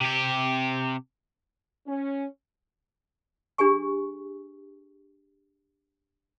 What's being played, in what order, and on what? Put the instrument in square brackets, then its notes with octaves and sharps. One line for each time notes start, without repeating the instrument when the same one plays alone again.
[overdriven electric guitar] C3 G4
[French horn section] C#4
[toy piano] D4 G4 G#4 G#5 C#6